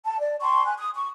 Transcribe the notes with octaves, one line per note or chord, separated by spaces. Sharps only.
A5
D5
G5 A5 C6 C#6
G#5 F#6
D#6
C#6